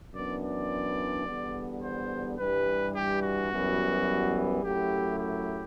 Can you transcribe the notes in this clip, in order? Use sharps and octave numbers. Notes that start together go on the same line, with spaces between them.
F#2 E3 B3 D4 D5
D5
E2 D3 G3 B3
C5
G2 E3 G3 B4
G4
F#4
F#2 E3 G3 B3
F#2 F#3 A3 E4 G4
G4